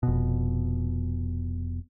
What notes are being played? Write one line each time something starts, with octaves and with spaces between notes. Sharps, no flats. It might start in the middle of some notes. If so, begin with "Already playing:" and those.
F1 B2